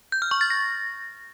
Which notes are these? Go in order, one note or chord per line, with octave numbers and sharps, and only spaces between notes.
G6
F6
C#6
A6
A#6